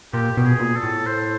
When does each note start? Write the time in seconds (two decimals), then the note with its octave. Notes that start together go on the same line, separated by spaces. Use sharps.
0.13 A#2 G4
0.37 B2 G4
0.45 G#4
0.60 A#2
0.76 A4
0.83 A2
1.06 C5